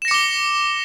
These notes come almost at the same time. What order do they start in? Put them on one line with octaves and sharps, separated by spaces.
E7 A#6 C#7 D6 G7